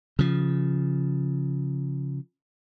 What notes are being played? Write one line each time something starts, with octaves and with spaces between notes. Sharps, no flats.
C#3 F3